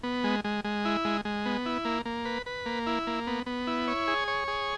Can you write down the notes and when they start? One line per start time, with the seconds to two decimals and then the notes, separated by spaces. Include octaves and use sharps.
0.03 B3
0.24 G#3
0.44 G#3
0.65 G#3
0.85 E4
1.05 G#3
1.25 G#3
1.46 B3
1.66 E4
1.85 A#3
2.05 A#3
2.25 B4
2.46 B4
2.66 A#3
2.87 E4
3.07 A#3
3.27 B3
3.46 B3
3.67 E4
3.88 C#5
4.08 G#4
4.28 C#5
4.48 G#4